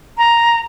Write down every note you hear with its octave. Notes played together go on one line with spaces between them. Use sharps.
A#5